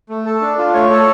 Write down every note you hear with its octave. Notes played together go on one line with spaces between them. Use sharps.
A3
A4
D4
F4
A3 C#5
A4